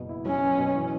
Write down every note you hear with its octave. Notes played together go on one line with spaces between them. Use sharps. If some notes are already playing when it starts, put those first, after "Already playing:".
Already playing: F#1 B2 B3
E4
F#3 C#4
B3
B2
E3